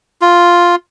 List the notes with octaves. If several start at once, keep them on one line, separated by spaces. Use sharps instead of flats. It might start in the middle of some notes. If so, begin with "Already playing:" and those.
F4